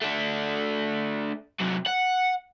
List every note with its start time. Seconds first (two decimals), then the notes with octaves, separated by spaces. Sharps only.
0.02 A3 D4
1.61 C3 F#3
1.87 F#5